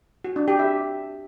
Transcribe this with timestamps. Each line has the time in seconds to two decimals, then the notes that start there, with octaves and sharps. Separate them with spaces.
0.24 F#4
0.36 D4
0.48 G4
0.59 E5